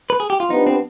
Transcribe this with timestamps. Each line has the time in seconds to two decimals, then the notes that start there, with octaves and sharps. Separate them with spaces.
0.10 B4
0.20 G#4
0.30 G4
0.40 F4
0.50 F3 B3 D4 D#4 G4 B4
0.67 C4